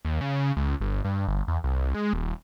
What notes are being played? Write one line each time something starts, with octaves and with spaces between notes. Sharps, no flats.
D#2
C#3
C#2
G1
G2
G1
E2
C2
G#3
D#1